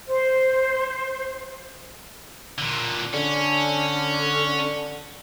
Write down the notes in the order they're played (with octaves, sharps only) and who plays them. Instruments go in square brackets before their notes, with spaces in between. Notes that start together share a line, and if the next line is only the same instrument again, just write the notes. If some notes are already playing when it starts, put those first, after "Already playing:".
[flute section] C5
[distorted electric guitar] A#2 D3
[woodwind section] D3 [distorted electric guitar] C#4